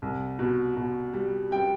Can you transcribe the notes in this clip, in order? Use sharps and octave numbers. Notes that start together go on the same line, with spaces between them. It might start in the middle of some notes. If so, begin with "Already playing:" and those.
C2
B2
B2
G3
G3 G5